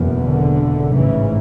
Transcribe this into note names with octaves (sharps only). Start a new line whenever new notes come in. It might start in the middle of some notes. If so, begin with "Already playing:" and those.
Already playing: F#1 E2 B2
D3
A1 G#2 C#3 E3